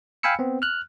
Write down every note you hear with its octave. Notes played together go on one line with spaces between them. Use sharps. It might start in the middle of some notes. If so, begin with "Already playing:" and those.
F5 G5 G#5 B5 E6 C#7
B3 C4
F6 F#6